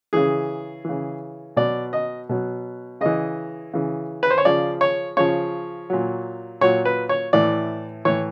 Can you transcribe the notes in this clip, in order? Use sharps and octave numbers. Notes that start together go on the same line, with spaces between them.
C#3 E3 G#4
C#3 E3
B2 F#3 D5
D#5
B2 F#3
C#3 E3 D#5
C#3 E3
B4
C5
C#5
C#3 F3 D5
C#5
C#3 F3 C#5
A#2 F#3
A#2 F#3 C#5
B4
C#5
A2 E3 D5
A2 E3 C#5